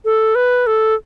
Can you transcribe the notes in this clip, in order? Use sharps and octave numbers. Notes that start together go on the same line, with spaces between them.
A4
B4
A4